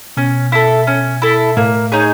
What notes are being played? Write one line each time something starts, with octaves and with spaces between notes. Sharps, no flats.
B2 C#4
E4 A4
C#4
E4 A4
A2 A#3
D#4 G#4 C#5